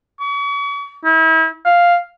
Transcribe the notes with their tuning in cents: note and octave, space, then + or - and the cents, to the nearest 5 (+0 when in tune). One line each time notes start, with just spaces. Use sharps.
C#6 +40
E4 -35
F5 +0